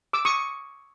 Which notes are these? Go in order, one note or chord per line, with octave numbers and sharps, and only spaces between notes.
D6 E6
C#6 D#6